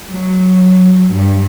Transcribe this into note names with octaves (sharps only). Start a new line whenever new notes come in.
F#3
G2